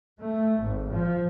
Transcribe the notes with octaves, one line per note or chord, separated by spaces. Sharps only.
A3
G#1
F3